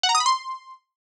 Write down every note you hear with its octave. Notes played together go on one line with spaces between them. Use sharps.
F#5
A#5
D#6
B5
C6